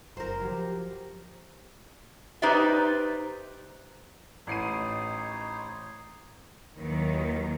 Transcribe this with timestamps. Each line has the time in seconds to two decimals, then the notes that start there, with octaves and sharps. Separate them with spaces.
0.17 F#1 A#4 C5 A#5
0.41 F3 F#3 G4
2.42 D#4 G4 B4 C5 D5 E5
4.47 A1 D#4 C5 C#5 C7 D#7
6.75 D#2 D#3 E3 F#3